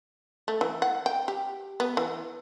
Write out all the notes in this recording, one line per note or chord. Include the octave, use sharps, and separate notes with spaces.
A3
E3
F#5
G5
G4
B3
E3